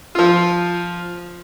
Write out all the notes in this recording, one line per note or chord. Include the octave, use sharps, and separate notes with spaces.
F3 F4